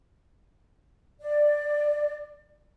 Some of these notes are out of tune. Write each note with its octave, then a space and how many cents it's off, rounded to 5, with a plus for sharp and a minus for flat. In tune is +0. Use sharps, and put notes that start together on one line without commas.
D5 +10